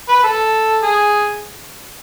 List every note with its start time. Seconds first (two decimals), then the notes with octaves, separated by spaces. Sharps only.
0.08 B4
0.23 A4
0.83 G#4